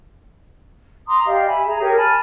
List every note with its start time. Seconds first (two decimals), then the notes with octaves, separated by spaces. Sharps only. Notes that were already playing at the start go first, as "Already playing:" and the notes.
1.08 A#5 C6 D6 D#6
1.27 G4 D5 D#5 F5
1.46 E5 G#5 B5
1.67 G#4 A#5
1.82 G4 G#4 A#4 C#5
1.96 G#5 A5 B5 F6